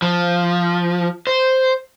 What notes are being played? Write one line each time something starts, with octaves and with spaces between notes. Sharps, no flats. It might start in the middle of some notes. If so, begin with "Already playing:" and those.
F3
C5